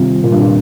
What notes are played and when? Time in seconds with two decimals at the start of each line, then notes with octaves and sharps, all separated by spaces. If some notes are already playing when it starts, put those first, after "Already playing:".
Already playing: C3 D#3 G3 C4 F4
0.23 A#2
0.32 G2
0.41 A#2